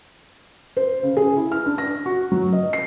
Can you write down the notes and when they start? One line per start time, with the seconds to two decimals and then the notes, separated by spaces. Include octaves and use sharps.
0.77 C5
1.03 C#3
1.17 G#4
1.37 E4
1.52 F6
1.66 D4
1.78 A#6
2.06 F#4
2.32 F#3
2.52 D#5
2.73 C7